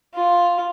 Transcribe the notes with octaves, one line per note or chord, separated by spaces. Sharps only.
F4